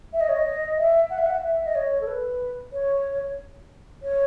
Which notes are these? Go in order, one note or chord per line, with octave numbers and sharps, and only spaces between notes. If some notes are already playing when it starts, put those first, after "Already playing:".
E5
D#5
C#5
D#5
E5
F#5
E5
F#5
E5
D#5
C#5
A4
B4
C#5
C#5